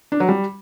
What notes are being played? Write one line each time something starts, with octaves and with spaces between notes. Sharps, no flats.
D4
F#3
G3